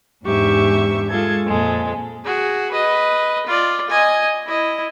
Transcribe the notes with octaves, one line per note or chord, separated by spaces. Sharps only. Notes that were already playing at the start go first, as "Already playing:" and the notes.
E2 G#2 D4 G4 E5 C#6
G#3 F4 G#4 A4 G#6
F2 A#2 G#3 A4
F#4 G#4
B4 D#5
F4 D5
D#5 G#5
E4 D#5